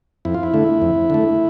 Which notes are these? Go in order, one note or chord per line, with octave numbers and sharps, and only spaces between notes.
F2 E4
F4
E4
D3 A3
F2
D3 A3